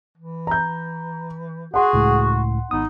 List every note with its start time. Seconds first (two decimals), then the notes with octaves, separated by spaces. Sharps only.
0.17 E3
0.47 A#5 G6
1.74 F#4 G#4 F#5 C6
1.93 C#2 A2
2.71 G#1 B3 D#4 D#6